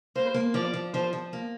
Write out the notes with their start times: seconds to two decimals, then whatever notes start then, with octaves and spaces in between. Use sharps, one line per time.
0.16 A#3 C5
0.34 A#3
0.54 F3 D5
0.74 F3
0.93 F3 C5
1.13 F3
1.33 A#3